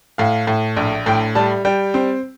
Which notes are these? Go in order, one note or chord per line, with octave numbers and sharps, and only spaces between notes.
A2 F5
A2
A#1
A2 G5
G3 A5
G3 G5
C4